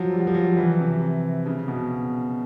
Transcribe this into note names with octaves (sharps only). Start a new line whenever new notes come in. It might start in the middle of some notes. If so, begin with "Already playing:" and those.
Already playing: F3 F#3
G3
F#3
F3
F#3
E3
C3
C#3
B2